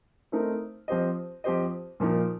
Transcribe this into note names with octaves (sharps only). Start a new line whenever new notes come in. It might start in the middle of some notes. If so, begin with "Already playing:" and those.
A3 C4 D#4 A#4
F3 C4 G4 C5 D#5
F3 C4 G4 C5 D#5
A#2 F3 A#3 D#4 A#4